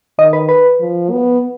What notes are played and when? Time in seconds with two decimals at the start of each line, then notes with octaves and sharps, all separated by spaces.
0.18 D#3 D#5
0.33 B4
0.49 B4
0.80 F3
1.11 B3